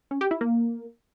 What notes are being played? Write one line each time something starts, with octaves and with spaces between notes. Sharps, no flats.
C#4
G4
E4
A#3